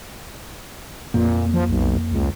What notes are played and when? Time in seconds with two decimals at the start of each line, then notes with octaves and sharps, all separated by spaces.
1.14 F2 A#2 A#3
1.54 F3
1.69 B1
2.12 C#2